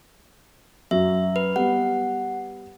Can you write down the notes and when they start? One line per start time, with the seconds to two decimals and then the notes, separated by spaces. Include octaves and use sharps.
0.91 F#2 F#3 E5
1.36 B4
1.56 G3 B3 F#5